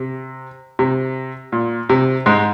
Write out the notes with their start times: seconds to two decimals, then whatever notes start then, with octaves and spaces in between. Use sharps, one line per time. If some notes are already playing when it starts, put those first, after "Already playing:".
Already playing: C3
0.79 C3
1.52 A#2
1.89 C3
2.26 G#2 G#3